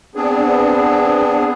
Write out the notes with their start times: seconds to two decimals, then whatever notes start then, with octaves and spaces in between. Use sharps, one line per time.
0.15 B3 C4 D4 G#4